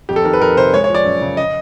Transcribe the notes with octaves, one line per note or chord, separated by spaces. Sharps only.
F2 G4
A4
D#3 A#4
B4
F2 A#4
C3 C5
G#3 C#5
C#5
F3 D5
F#2
C#3
D#5